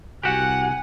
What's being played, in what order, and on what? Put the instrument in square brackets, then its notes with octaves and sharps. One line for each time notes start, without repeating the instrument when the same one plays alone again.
[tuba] C2 [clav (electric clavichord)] F#4 G4 [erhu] F#5 [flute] G#5